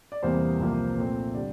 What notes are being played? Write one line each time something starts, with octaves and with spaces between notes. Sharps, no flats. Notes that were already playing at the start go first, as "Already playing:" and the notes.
D5
E2 C3 E3 G3 A#3 C5
C2 C3 F3 A#3
A#2 A3 C4
D3 G3 D5